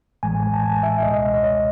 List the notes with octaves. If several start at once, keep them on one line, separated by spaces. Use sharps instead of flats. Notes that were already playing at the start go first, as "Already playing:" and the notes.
A1 A2 E3 G#3 G#5
G#5
A5
G#5
E5
C#2 B2 G#3 D#5
D#5
C#5